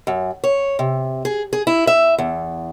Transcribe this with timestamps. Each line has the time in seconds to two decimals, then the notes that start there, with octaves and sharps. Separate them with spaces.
0.07 F#2
0.44 C#5
0.79 C3
1.25 G#4
1.53 G#4
1.67 E4
1.87 E5
2.18 E2